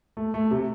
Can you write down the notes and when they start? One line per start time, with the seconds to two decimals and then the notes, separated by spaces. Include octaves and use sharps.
0.17 A3
0.34 A3
0.51 C3